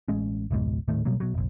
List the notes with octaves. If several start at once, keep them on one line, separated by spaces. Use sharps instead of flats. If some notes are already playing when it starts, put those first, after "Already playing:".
A1 G#3 C#4
F1 C#2 G#2 B2
D#1 A2 D#3 A3
B2 F#3 G3 A#3
B2 F#3
F1 A#1